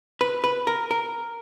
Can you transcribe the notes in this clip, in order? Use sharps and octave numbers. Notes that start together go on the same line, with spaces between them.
B4
B4
A#4
A#4